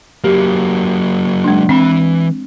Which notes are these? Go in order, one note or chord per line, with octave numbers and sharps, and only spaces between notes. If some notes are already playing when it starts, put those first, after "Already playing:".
F#3 A#3 G4
G#3 D4
E3 C4 B5